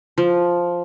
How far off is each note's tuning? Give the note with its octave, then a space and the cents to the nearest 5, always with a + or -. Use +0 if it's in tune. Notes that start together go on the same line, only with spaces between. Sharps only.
F3 +0